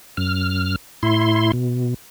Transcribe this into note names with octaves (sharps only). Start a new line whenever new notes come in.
F#2 F6
A2 E4 C6
B2